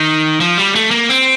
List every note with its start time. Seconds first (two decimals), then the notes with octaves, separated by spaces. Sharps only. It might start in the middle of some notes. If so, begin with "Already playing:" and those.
Already playing: D#3
0.40 F3
0.58 G3
0.75 A3
0.91 A#3
1.09 C4